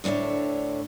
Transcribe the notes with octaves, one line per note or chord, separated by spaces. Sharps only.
D2 A2 D4 C#5 E5